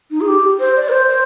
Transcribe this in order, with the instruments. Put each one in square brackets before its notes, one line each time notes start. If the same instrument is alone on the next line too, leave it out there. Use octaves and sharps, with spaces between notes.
[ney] D#4
G#4
G4
C5
D5
A#4
C5
C5